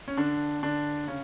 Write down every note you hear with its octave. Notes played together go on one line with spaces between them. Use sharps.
C#4
D3 D4
D3 D4
C#3 C#4